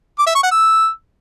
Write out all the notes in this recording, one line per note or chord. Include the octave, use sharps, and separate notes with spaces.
D6
E5
C#6
F#5
E6